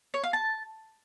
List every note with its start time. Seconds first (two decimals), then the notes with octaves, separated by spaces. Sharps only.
0.14 C#5
0.24 F5
0.33 A5